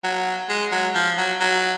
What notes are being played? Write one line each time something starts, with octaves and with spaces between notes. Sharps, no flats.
F#3
G#3
F#3
F3
F#3
F#3